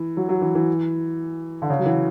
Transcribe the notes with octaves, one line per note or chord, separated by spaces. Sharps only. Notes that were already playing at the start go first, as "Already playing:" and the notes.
Already playing: E3
F#3
F#3
E3
E3
D3
C#3
F#3
E3